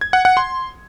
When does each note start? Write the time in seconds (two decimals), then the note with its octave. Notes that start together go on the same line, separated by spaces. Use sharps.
0.01 G#6
0.13 F#5
0.25 F#5
0.37 C6